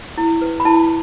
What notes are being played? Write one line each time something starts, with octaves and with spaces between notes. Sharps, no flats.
E4
B4
B5
E4 A5